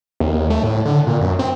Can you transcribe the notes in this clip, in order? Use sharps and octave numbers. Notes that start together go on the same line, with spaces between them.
D#2
A3
A2
D3
A#2
F#2
C4